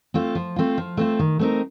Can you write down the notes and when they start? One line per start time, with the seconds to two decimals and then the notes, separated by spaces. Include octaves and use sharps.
0.14 A3 C4 F4
0.35 F3
0.56 A3 C4 F4
0.78 F3
0.97 A3 C4 F4
1.19 D#3
1.39 A3 C4 D#4 A#4